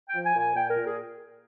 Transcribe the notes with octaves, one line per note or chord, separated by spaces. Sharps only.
G5
F3
G#5
A#2 G#5
A#2 G5
A#4
A#2
G#4